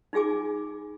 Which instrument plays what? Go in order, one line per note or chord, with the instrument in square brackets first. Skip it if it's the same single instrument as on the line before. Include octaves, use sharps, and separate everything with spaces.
[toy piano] D#4 F4 G#4 G#5 D6